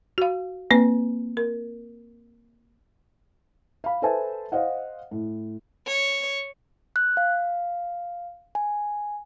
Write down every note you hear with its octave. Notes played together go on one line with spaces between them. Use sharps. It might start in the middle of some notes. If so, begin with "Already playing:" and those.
F#4 F5
A#3 C4 B4
A#4
F5 B5
A4 B4 C5 E5 G#5 A5
C5 D#5 F5 F#5
A2
C#5
F#6
F5
G#5